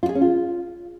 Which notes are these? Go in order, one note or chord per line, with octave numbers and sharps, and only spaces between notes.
F4
G#4
C#4
F4